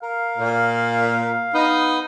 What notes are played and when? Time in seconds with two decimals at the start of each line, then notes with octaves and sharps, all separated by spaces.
0.02 A#4 F5
0.38 A#2
1.54 B3 D#4 B4